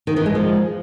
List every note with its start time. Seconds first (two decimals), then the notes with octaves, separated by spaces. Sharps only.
0.07 D#3
0.16 E3
0.26 G#3
0.35 F3